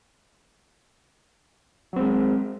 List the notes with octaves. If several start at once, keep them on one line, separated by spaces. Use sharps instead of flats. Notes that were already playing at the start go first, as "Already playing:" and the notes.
F#3 G#3 C4